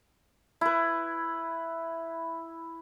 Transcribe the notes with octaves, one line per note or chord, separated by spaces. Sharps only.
E4 B4